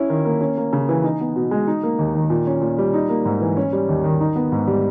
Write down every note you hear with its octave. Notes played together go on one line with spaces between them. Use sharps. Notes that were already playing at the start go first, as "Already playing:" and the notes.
Already playing: C#4 E4
D#3
A#3
C#4
A#3
C#3
E3
D#4
B3
B2
G#3
D#4
A#3
D#2
D#3
A#2
C#4
A#2
G3
D#4
A#3
G#2
E3
C#4
G3
D#2
D#3
D#4
B3
G#2
G3